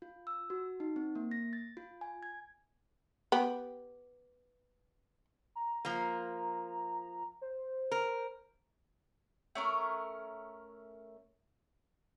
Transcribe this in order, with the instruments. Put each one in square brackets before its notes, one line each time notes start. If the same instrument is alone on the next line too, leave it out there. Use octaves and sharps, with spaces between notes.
[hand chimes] F4
E6
F#4
D#4
C4
A#3
A#6
A6
F4
G#5
G#6
[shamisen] B3 G4
[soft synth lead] A#5
[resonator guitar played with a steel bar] F3 A#3
[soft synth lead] C5
[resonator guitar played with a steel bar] A#4
[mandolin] A3 C#4 A#4